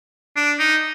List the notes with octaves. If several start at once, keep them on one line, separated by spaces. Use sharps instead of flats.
D4
D#4